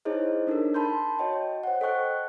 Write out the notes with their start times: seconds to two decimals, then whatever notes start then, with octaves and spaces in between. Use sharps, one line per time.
0.05 D#4 E4 G#4 C5 C#5 D#5
0.47 D4 D#4 A4 A#4
0.74 A5 B5 C6 G6
1.19 F#4 C#5 D#5 G5
1.64 C5 F#5
1.81 A4 D#5 G5 C#6 F#6